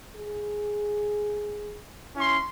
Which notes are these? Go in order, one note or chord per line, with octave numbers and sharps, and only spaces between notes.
G#4
C#4 E4 C6